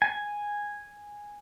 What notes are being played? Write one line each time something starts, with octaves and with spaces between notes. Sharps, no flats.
G#5